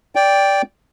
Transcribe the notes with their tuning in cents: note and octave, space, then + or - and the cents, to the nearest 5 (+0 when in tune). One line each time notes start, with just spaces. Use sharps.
D5 -15 G5 +5